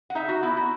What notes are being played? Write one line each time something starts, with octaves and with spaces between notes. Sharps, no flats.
F#5
D#4 E5
F#4
B3 E4
F#4